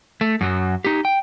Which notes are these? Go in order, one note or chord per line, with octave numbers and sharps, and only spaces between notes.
A3
F#2 F#3
D#4 G4
G5